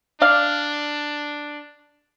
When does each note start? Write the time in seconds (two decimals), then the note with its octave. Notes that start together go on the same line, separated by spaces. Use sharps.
0.21 D4 D5 F5